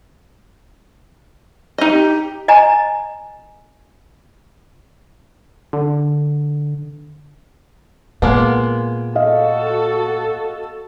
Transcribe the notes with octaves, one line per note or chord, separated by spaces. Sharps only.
D#4 G4 D#5
D#5 G#5 A#5
D3
A#2 G#3 A#3 B3
F#4 A4 D#5 F5